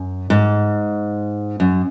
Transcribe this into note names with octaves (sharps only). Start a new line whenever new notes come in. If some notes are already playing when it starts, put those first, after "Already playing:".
Already playing: F#2
G#2
F#2